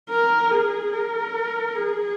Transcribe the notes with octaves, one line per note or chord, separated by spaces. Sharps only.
A#4
G#4
A#4
G#4